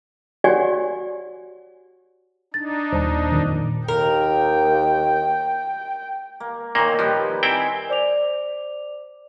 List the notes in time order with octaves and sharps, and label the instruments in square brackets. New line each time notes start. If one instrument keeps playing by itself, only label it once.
[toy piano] F#4 G4 C#5 D5 F#5 G#5
[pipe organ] D4 D#4 [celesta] A6
[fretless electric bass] D#1 [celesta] C5 A5
[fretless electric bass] F2 A#2 D#3
[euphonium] D#2 [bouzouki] A#4 [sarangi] G5
[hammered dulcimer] A#3
[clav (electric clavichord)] A#2 A#3 [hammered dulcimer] D#3 D#4 C#5
[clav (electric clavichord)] F3 [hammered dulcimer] G3 G4 B4
[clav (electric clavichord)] C4 E4 G5 [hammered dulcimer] G#5 B5
[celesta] C5 D5 D6 F7